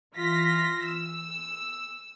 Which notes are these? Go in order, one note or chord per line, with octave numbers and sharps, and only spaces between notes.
E3 F4 A#6 B6
E6